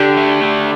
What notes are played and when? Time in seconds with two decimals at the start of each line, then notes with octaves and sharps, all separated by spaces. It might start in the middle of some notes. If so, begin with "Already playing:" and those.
Already playing: D3 D4 G4
0.17 A3
0.43 D3